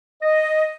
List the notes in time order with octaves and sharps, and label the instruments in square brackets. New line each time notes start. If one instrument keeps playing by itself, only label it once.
[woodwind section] D#5